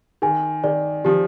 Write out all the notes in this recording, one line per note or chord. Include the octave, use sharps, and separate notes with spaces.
D#3 G#5
D#3 D5
F3 G4